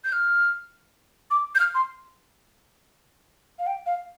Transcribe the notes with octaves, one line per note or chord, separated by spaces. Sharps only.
G6
F6
D6
G6
F6
C6
F5
G5
F5